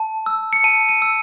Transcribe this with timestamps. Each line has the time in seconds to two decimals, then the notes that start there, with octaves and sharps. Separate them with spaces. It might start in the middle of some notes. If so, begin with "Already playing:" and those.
Already playing: A5
0.26 E6
0.53 C#7
0.64 A5 D#7
0.89 D#7
1.02 E6